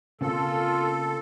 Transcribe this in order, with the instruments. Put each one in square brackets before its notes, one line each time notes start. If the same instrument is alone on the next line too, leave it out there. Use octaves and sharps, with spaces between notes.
[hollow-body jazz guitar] C#3 A#3 C4 [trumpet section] F4 [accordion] A4